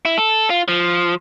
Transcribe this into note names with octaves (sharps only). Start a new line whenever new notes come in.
E4
A4
F4
F3